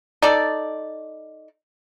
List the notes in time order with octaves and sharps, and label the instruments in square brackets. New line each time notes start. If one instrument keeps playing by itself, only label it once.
[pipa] D#4 A4 D5